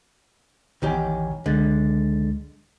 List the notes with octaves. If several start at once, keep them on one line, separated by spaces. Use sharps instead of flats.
A#1 E2 D#3 G4 C#5 G#5
C#2 D3 G#3 A6